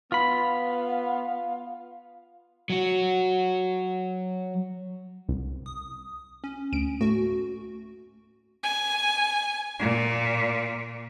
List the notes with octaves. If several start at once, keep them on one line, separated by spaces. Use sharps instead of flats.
B3 F4 F5 B5
F#3 F#4
C2
D#6
C#4
D2 D7
A2 F#4
G#5
A#2